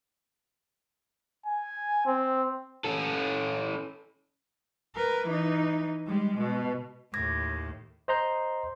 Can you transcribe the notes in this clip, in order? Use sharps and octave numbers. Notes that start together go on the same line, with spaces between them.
G#5
C4
C#4 A4
A#4 B4
E3 D#4
G3 G#3
B2
D#2 A2 D6 G#6 A#6
C5 D#5 A#5 C6 G6